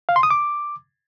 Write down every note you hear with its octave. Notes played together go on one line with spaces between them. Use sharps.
F5
C6
D#6
D6